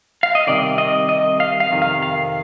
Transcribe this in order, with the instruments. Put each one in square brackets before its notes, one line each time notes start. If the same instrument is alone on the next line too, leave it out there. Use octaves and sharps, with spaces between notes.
[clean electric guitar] F5
D#5
C2 C3 D#3 D5
D#5
D#5
F5
F5
F2 C3 D#3
F5
F5